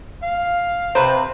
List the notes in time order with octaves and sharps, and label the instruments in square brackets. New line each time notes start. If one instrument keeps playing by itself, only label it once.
[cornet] F5
[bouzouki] C3 B4 [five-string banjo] C5